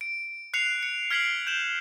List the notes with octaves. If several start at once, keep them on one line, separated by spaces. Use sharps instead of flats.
D7
F#6 C7 C#7 F7
C#7
F6 G#6 B6 C7 D7 F#7
G6 E7 F#7